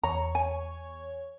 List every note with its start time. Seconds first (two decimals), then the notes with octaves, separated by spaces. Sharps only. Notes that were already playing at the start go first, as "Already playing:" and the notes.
0.03 E2 C#5 A#5 C#6
0.35 G#5